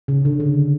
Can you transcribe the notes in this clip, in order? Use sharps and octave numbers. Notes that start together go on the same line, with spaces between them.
C#3
D3
D3